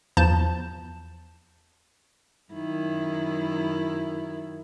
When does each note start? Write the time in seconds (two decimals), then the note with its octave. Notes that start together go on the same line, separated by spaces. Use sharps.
0.17 E2 F3 A5 G6 E7
2.53 F#2 D#3 E4